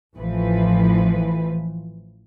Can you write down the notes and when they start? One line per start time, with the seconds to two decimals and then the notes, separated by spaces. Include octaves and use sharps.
0.15 A1 E3 F3 B4